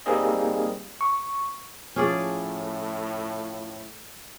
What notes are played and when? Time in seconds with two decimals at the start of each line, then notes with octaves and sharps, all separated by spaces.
0.06 G3 A#3 C4 D#4 G#4 D#5
1.01 C#6
1.96 A2 F3 C#4 G#4 D5